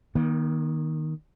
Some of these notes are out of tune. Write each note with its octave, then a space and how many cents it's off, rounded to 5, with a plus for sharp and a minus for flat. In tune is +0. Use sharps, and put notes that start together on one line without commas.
D#3 +0 A#3 +45